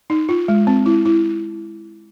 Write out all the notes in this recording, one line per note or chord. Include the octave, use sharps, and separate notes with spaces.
D#4
F4
G#3
C4
E4
E4